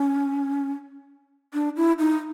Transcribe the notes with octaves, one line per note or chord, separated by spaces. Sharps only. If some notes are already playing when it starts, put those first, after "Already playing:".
Already playing: C#4
D4
E4
D#4